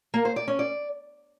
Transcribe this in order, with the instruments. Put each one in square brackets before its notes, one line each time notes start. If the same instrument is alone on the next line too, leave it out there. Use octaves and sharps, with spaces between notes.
[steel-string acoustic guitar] A#3
C5
D5
C#4
D5